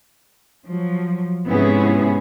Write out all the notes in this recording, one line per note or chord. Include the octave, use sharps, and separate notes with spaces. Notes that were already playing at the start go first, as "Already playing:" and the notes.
F3 F#3
G#2 C3 B3 C#4 E4 G#4